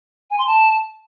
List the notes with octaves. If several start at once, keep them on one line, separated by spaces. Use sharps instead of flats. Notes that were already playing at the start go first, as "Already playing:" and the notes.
G#5
C6
A5